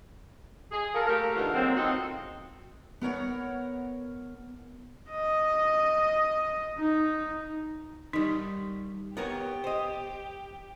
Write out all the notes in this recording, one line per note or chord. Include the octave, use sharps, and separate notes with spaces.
G#4
F4 A4 A#4
A3 A#3 G4 A#4
D3 E3 D#4 F4
F#3 G#3 A#3 C4
C4 D#4 F4 F#4 A4
B3 A#4 C#5 F#5
D#5
D#4
D#3 G3 D#4
B3 G4 A#4 C#5
C5 D#5